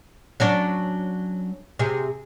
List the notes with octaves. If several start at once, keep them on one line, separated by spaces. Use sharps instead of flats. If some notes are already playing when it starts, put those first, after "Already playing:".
F#3 C#4 D4
C3 G#4